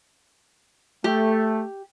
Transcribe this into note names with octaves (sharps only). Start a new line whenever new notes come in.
A3 G4